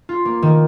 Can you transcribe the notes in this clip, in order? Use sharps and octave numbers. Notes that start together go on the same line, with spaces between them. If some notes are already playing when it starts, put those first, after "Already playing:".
F4
A#3
D#3